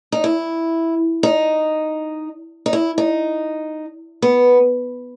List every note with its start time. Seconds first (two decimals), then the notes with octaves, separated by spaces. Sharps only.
0.12 D#4
0.24 E4
1.23 D#4
2.66 D#4
2.73 E4
2.98 D#4
4.22 B3